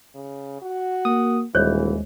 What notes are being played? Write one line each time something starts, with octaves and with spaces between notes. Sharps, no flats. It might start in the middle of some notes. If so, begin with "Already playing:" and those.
C#3
F#4
A#3 D#6
D#1 D#2 E3 G#3 C5 C#5